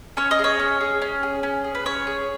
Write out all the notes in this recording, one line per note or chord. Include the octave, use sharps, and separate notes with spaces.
C#4 C#5
D#5
G#4
C#5
C#4
G#4
C#4
G#4
C#4
G#4
B4
C#4 C#5
G#4